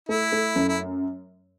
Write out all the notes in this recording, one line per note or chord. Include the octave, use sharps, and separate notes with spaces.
A3 E4
A3
F#2
E4